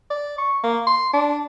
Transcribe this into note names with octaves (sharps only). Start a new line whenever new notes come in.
D5
C#6
A#3
C6
D4